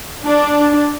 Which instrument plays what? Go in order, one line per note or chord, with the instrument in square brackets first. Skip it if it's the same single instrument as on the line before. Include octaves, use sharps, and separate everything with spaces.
[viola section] D4